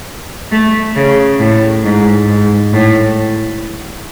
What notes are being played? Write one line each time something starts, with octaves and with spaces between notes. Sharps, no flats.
A3
C#3
A2
G#2
G#2
A2